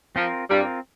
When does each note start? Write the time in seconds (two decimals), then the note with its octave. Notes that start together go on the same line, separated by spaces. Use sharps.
0.16 F3 C4 F4 A#4
0.51 G2 G3 C4 F4 A#4